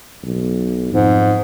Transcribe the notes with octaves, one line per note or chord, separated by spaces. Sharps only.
B1
F2 G#2